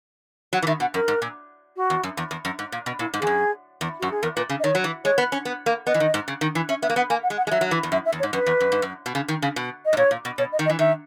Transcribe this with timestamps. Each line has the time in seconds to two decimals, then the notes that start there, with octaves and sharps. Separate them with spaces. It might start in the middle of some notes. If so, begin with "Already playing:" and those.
0.53 F#3 F#5
0.62 E3
0.67 D#3 E5
0.80 B2 F#5
0.94 F#2 A#4
1.08 G#2
1.22 A#2
1.76 F#4
1.90 E2
2.03 F#2
2.17 E2
2.31 E2
2.45 F#2
2.59 G#2
2.72 A#2
2.86 B2
2.99 A#2 E4
3.14 G#2
3.20 E2 G#4
3.27 F#2
3.81 E2
4.00 F#2 F#4
4.11 G#4
4.22 E2 A#4
4.36 A#2 B4
4.49 C#3
4.60 D#5
4.63 D#3 C#5
4.75 F#3
4.84 E3
5.04 G#3 C#5
5.18 B3
5.32 C#4
5.45 B3
5.66 A#3
5.87 B3 D#5
5.94 E3
6.00 D#3
6.14 G#2
6.28 C#3
6.41 D#3
6.55 E3
6.69 C#4 E5
6.82 B3 E5
6.90 A#3
6.96 B3 F#5
7.09 A#3 G#5
7.23 F#5
7.30 G#3
7.37 F#5
7.47 G#3
7.50 F#3 E5
7.61 F#3
7.71 E3
7.83 E2
7.92 F#2 E5
8.05 E5
8.12 E2
8.19 C#5
8.23 G#2
8.33 F#2 B4
8.46 E2
8.60 F#2
8.72 G#2
8.82 F#2
9.06 B2
9.15 C#3
9.28 D#3
9.42 C#3
9.56 B2
9.85 D#5
9.93 G#2
9.97 A#2 C#5
10.11 A#2
10.25 B2
10.38 B2 C#5
10.52 D#5
10.59 D#3
10.65 D#5
10.70 E3
10.79 D#3 E5